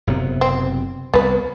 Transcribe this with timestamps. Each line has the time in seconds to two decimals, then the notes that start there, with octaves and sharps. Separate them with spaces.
0.07 F#1 C3 B3
0.41 C4
1.13 C2 B3 B4